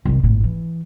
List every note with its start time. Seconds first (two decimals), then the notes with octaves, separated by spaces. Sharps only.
0.05 C2 D#3
0.23 G#1 A2
0.44 E3